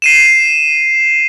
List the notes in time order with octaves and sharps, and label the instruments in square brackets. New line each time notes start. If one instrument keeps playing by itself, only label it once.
[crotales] C7 D#7 E7